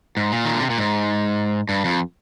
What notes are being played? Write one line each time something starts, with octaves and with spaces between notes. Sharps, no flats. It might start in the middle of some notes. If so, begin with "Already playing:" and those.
G#2
A#2
D#3
D3
C3
A#2
G#2
G2
F2